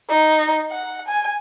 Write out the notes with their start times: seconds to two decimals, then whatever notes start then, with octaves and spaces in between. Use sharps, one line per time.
0.10 D#4
0.72 F#5
1.08 G#5